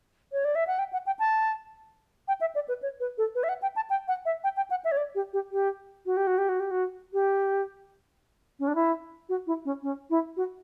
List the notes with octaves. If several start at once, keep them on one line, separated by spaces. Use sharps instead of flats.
C#5
D5
E5
F#5
G5
F#5
G5
A5
G5
E5
D5
B4
C#5
B4
A4
B4
E5
F#5
G5
A5
G5
F#5
E5
G5
G5
F#5
E5
C#5
D5
G4
G4
G4
F#4
G4
F#4
G4
F#4
G4
F#4
G4
C#4
D4
E4
F#4
E4
C#4
C#4
E4
F#4